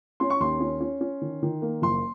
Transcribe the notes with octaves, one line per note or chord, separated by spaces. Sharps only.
C#4 C6
C#6
D#2 C6
C#4
C#4
C#4
D#3
D#3
A#3
F#1 C6